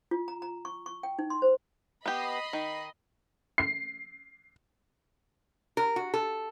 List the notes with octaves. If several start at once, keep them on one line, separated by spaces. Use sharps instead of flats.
F4
A#5
A#5
C#6
C#6
G5
D#4
C6
C5
B3 G4 D#5 B5 C7
D#3
C7
A#4
F#4
A4